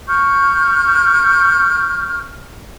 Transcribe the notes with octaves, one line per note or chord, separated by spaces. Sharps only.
C#6 F6 G6